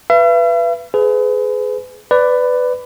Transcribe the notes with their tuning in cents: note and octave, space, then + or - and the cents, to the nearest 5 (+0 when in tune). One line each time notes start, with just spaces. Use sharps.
B4 +0 E5 +45
G#4 +25 B4 +35
B4 +15 D5 +0